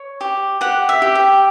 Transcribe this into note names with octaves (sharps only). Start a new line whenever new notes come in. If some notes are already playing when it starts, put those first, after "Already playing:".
Already playing: C#5
G4
G4 F#5
E5
G4
G5